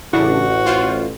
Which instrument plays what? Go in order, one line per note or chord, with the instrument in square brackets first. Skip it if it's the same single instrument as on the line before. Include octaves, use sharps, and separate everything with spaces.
[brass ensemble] A1 [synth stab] C#3 D4 [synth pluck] E4 [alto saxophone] F#4
[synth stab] F4 C5